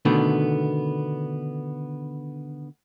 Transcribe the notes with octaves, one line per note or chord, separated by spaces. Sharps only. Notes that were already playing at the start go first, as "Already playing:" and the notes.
B2 D3 D#3 A3 B3